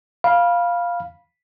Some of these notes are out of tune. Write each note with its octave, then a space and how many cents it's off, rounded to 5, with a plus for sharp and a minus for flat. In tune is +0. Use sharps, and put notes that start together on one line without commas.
F5 +0 B5 -20